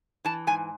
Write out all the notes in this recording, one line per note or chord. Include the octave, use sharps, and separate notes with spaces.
E3 A5
G#2 G#5